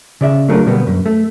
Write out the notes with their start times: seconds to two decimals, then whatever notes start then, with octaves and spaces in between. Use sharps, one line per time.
0.21 C#3 D5 E5
0.48 F#3 G#3 A3 D4 F4 A#4
0.66 B2 D3 G3 A#3 B3
0.87 F#2
1.06 A3